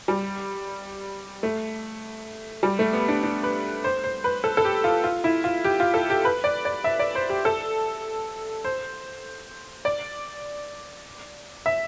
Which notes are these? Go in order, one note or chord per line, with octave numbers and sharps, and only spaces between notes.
G3
A3
G3
A3
B3
D4
D4
B4
C5
C5
B4
A4
A4
G4
F4
F4
E4
F4
G4
F4
A4
G4
B4
D5
D5
E5
D5
C5
G4
A4
C5
D5
E5